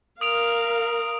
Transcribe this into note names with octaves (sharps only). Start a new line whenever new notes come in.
A#4 F5 D#6 D7 F7